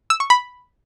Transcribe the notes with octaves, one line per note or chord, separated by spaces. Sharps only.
E6
C#6
B5